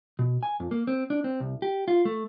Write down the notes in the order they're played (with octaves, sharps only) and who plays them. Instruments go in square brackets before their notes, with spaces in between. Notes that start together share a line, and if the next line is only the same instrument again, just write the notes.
[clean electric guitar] B2
G#5
F2
A#3
C4
D4
C4
C2
G4
F4
A3